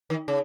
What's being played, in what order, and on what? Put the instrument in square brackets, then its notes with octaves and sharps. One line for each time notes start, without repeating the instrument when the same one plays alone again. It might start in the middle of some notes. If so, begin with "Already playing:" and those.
[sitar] D#3
C#3